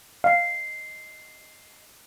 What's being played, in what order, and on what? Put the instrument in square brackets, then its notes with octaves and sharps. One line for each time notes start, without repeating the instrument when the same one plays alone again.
[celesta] D#5 C7 [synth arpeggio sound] F5